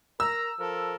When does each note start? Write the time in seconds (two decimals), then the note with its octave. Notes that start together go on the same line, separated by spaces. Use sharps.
0.20 A#4 A#5 E6
0.59 F3 A4 A#4